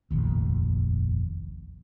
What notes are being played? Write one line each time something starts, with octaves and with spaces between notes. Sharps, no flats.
F1 A#1 D#2